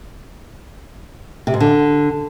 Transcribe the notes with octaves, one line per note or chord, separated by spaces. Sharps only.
C3
G#2
D3